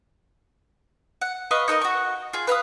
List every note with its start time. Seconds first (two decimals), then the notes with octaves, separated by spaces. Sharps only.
1.21 F#5
1.51 B4 D#5 F5 C#6
1.68 D#4 A4 A#4 D#5
1.82 F#4 C#6
2.33 F4 G#4
2.47 B4 F5 B5 D#6